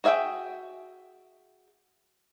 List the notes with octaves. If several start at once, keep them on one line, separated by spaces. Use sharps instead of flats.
F#4 G#4 E5 F5 G5